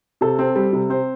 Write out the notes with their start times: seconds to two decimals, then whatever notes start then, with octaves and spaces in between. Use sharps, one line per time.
0.21 C3 A4
0.39 C4
0.56 G3
0.73 C3
0.90 C4 C5